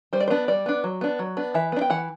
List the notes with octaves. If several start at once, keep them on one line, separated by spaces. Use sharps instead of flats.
G3 C5
D5
C5
B3 D4
G3 D5
B3 D4
F#3
B3 D4
F#3
B3 D4
E3 E5
B3 D4
G5
E3 F#5